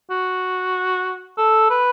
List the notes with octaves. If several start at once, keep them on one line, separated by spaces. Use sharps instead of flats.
F#4
A4
B4